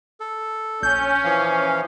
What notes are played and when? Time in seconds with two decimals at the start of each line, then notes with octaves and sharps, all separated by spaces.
0.20 A4
0.83 A#1 C#4 G6
1.24 E3 F3 F5